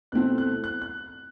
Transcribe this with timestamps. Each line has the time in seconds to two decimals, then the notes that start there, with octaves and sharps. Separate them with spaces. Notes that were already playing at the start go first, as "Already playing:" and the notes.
0.12 B2 A3 C4 E4 F#6
0.38 F#6
0.64 F#6
0.82 F#6